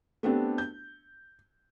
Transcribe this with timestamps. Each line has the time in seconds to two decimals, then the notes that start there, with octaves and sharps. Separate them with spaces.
0.23 A3 B3 C4 D4 G4
0.58 G6